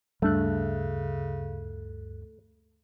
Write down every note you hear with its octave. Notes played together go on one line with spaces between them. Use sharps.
D2 G2 C#3 G3 A3 D4 F#6